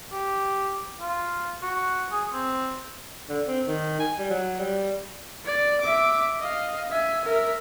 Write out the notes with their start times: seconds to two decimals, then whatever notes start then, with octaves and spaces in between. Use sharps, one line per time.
0.12 G4
1.01 F4
1.62 F#4
2.11 G#4
2.33 C4
3.29 D3
3.47 C4
3.66 D#3
3.99 G#5
4.19 G3
4.30 F#3
4.59 G3
5.45 D5
5.81 E5 D6
6.40 D#5 F5
6.90 E5 G#5
7.25 A#4 E5